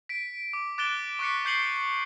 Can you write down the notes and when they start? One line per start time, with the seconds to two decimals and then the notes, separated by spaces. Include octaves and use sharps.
0.09 B6 D7
0.53 D6
0.78 D6 F#6 A6 D7 E7 G7
1.19 C#6 D6 F#6 B6 C#7
1.45 C#6 G6 C7 C#7 F#7 G7